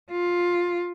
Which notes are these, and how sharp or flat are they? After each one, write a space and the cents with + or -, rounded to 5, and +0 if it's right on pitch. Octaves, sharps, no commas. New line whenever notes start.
F4 +10